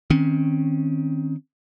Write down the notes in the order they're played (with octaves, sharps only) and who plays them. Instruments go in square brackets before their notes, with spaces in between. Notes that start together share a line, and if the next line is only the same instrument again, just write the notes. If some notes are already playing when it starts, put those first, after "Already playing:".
[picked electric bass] D#3 C4 C#4